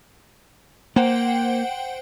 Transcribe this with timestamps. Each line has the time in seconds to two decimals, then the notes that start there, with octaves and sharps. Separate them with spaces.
0.96 A#3 C5 F#5 G5